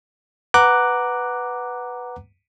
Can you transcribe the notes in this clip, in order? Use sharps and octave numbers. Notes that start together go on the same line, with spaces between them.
B4 F#5 A#5 D6 F#6